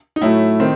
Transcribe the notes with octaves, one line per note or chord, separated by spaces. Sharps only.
D#4
A2 F#3 A3 E4
D#3 C4